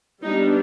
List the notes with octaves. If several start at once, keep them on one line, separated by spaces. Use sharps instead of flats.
G3 B3 D4 D#4